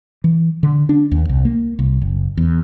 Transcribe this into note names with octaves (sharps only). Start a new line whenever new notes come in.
E3
D3
D4
D#2
C2
A#3
C2
F#1
E2